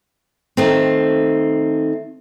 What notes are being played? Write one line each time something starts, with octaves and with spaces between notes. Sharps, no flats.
D#3 A3 C4